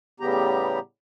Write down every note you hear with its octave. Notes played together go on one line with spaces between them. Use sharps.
A2 C#3 G3 B3 G4 A#5